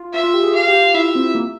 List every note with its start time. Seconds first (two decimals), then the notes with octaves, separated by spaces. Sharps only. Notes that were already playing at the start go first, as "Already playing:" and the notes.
Already playing: F4
0.13 F4 E5
0.23 F4
0.34 G4
0.43 G#4
0.53 G4 F5
0.68 G4
0.82 F4
0.94 E4 E5
1.15 C4
1.35 A#3